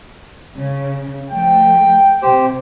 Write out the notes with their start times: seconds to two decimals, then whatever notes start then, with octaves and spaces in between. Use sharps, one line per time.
0.56 C#3
1.29 F3 A3 G5
2.22 C3 G4 C5